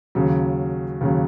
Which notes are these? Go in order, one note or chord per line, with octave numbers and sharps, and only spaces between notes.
D#2 C#3 F#3
D#2 C#3 F#3